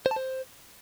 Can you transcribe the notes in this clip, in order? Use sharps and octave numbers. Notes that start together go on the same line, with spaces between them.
C5
A5
C5